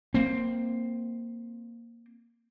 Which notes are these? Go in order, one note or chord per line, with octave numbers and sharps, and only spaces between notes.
A#3 C4